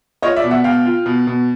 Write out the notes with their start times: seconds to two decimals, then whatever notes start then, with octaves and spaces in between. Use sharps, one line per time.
0.22 F4 C#5 D#5
0.36 D5 E5
0.44 B2
0.51 E5 F#5
0.64 B2 F5 G5
0.85 F4
1.06 B2
1.27 B2